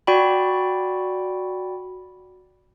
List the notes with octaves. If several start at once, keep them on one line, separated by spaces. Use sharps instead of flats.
F#4 D5 G5 B5